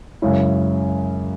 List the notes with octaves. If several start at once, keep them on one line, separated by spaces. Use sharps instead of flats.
F#2 C#3 G#3 C#4 E4